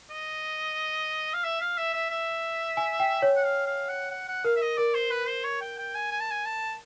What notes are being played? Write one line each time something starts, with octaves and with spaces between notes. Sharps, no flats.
D#5
F5
E5
F5
E5
E5
E5
G#5
G5
C#5
F#5
F5
F5
F#5
F#5
F#5
A#4 F5
E5
D#5
A#4 D5
C5
B4
C5
C#5
G5
G5
G#5
G#5
A5
G#5
A5